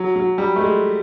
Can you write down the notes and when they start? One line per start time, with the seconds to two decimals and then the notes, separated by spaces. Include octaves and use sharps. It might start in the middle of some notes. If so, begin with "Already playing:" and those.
Already playing: F#3
0.16 F#3
0.38 G3
0.56 A3
0.61 G#3